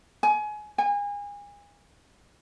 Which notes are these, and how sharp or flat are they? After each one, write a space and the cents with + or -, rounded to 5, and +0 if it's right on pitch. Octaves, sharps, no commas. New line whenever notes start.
G#5 +25
G#5 -30